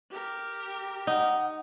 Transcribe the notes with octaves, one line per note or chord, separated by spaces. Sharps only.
G4 A#4
D#4 F#5